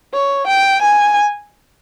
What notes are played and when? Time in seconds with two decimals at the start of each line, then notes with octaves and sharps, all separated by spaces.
0.13 C#5
0.47 G5
0.82 G#5